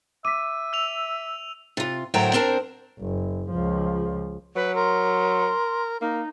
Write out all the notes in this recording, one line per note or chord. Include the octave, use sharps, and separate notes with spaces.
E5 D6 B6 D#7
E6 F7
C3 F4
D2 A2 F#3 A#4 C5 G5
C4 D4 A#4 C5
F#1
C#2 F3
F#3 B4
A#4 C6
A#3 D#4